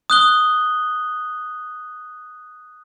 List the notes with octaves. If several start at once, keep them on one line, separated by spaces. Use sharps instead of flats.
D#6 F#6 G7